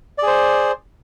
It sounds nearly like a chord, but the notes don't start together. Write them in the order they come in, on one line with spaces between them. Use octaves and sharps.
D5 G#4 C5